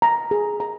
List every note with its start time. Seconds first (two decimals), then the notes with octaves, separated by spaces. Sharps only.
0.02 A#5
0.31 G#4
0.60 A#5